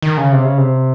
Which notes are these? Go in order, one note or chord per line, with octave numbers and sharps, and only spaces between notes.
D#3
C#3
C3
C#3
C3